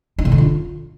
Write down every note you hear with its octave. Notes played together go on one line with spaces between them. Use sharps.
D#4
C#3
D3
F4